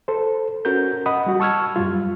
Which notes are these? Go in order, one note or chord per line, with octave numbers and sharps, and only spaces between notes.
A4 C5
C#4 F#4 A#4 G6
D#5 F#5 B5 D#6
G3 F#4
A5 C#6 E6 F6 G#6
F#2 G3 F4